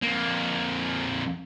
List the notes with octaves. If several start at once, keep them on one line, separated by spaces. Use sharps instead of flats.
F2 A#3